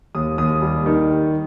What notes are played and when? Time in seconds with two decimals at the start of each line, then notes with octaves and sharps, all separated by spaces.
0.15 D#2 D#6
0.38 D#2 D#6
0.62 G3
0.86 D#3